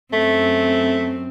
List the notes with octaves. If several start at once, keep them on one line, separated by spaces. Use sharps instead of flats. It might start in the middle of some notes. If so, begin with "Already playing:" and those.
F#2 A3 C4